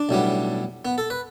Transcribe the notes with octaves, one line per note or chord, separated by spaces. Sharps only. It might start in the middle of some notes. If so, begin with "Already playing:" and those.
Already playing: D4
B1 A2 G3 B3
B3
A4
B4